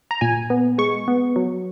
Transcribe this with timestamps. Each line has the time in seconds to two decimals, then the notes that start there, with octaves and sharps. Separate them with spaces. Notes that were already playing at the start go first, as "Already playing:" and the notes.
0.11 A#5
0.21 A#2 G#5
0.50 B3
0.78 G#3 C#6
1.08 B3
1.36 F#3